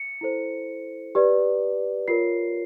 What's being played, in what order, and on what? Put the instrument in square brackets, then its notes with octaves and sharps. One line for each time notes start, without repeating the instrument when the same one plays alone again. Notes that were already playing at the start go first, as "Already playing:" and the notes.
Already playing: [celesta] C#7
E4 A4 C5
G4 B4 D5
F4 A#4 C#5 C7